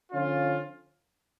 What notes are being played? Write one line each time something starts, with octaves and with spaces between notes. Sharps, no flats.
D3 F3 C#4 F4